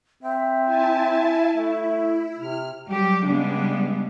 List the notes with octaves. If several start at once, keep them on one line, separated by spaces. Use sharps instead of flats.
C4 E5
E4 G#5 A5
A3 E4
C3 F6
F#3 G3 G4
C#3 G3 G#3 B3 D4